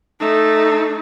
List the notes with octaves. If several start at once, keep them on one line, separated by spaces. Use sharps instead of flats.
A3 D#4